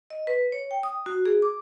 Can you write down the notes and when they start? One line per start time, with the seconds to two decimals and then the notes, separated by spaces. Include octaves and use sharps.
0.10 D#5
0.27 B4
0.52 C#5
0.71 G5
0.83 D#6
1.06 F#4
1.26 G#4
1.42 D6